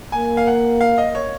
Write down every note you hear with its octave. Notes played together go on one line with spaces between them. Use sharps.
A#3 G#5
F5
F#5
F5
D#5
C#5